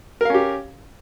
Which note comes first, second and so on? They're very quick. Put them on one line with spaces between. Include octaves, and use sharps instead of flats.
A#4 F5 C#4 G4